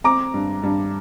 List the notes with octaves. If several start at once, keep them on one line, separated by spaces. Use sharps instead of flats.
C4 A#5 D6
G2
G2